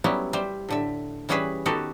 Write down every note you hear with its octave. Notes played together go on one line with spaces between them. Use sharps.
F#3 G3 B3 C#4 E4
G3 C5 E5
A2 D3 E5
E3 G3 C#4 G#4 B4 E5
D#3 B3 F#4 G4 A4